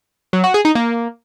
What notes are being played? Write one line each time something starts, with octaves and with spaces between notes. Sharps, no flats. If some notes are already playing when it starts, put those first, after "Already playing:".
F#3
F#4
G#4
D#4
A#3